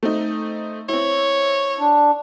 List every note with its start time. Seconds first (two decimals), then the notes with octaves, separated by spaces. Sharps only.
0.03 A3 C4 D#4
0.89 C4 E4 C#5
1.79 D4